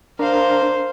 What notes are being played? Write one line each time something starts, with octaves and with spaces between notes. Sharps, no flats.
D4 A#4 C5 F5